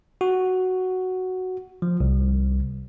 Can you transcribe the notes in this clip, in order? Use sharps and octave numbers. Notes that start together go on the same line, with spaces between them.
F#4
F3
C2